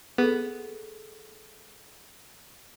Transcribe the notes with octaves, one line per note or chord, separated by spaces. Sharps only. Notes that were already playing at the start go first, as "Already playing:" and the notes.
B3 G#4 A4